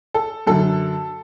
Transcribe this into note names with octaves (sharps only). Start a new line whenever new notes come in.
A4
F#2 D3 A4